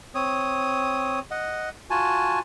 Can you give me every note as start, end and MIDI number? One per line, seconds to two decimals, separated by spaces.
0.15 1.19 60
0.15 1.19 73
0.15 1.19 87
1.31 1.69 75
1.31 1.69 78
1.90 2.39 65
1.90 2.39 66
1.90 2.39 80
1.90 2.39 81